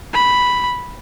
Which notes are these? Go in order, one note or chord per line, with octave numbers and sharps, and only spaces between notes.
B5